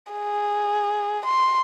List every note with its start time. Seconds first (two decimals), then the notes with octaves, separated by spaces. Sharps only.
0.12 G#4
1.26 C6